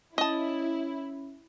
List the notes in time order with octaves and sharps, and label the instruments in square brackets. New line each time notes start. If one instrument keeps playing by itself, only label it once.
[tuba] C#4 [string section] E4 [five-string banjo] D#5 A5